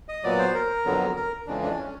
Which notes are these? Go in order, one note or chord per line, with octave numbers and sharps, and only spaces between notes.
D#5
A#2 F#3 B3 D5
C5
A#4
F2 D3 F#3 B3
A#4
F2 C#3 E3 G#3 D4
D4
C#4